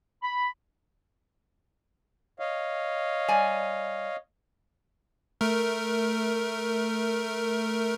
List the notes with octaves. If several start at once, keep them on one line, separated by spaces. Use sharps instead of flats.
B5
C#5 D#5 F5
G3 D5 G#5
A3 A#4